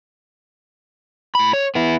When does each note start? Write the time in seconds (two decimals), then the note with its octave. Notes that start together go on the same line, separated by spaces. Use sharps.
1.35 A2 B5
1.53 C#5
1.75 B3 E4